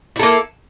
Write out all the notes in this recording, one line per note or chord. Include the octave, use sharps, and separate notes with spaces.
A#3 E4 A4